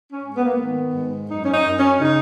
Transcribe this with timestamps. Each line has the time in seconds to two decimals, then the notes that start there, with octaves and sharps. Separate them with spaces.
0.12 C#4
0.23 G#2
0.35 B3
0.44 A#3
0.52 B3
0.58 D#3
0.94 G#2
1.30 F#2 D#4
1.45 C#4
1.53 D#4
1.65 F#2
1.77 C#4
2.00 C#3 D#4